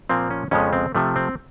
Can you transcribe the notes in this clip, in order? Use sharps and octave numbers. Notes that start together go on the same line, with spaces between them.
A#2 F3 A#3 C4
C#4
F2 C#3 F3 G#3 B3 C#4
C4
C3 F3 A3
C4